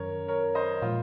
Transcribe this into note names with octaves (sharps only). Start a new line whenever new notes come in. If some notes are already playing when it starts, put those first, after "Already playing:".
Already playing: F#2 D#3 F#3 C#4 A#4 C#5
A#4 C#5
C5 D#5
A#2 F3 G#3 F4